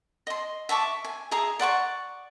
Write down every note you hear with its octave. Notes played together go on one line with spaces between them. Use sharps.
D#5 C6
E5 A5 C#6 D6
G#5
G#4 E5 A#5 D#6
D5 F#5 C6 C#6